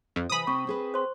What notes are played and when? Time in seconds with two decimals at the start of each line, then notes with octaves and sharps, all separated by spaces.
0.16 F2
0.30 C3 E3 G#5 B5 D#6
0.47 C3 C4 C#6
0.67 C4 G#4 B4
0.94 C5 C6